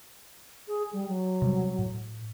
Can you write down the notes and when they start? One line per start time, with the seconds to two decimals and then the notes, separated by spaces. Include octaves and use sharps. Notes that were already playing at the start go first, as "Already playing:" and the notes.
0.68 G#4
0.93 G3
1.08 F#3
1.42 C3 G3
1.78 A2